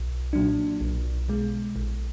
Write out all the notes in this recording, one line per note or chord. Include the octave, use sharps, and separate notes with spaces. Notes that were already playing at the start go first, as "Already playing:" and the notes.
Already playing: B1
A#2 F#3 D4
B1
B2 G#3
A#1